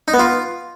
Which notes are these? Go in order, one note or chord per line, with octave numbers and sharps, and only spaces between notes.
D#4
B3
F4